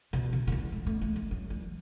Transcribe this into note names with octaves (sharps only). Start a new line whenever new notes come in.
B2
D3
D3
E3
G#3
A3
A3
G#3
F#3
E3